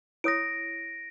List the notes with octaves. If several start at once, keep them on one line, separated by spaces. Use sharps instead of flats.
E4 C#5 D#6 A#6 D7